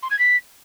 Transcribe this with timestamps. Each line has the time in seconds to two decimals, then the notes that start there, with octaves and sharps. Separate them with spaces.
0.03 C6
0.11 G#6
0.19 B6